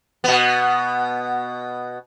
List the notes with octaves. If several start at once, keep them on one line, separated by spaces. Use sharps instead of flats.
B2 B3